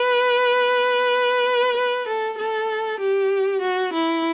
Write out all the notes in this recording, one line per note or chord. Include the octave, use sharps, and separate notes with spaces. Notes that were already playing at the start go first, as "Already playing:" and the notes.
Already playing: B4
B4
A4
A4
G4
F#4
E4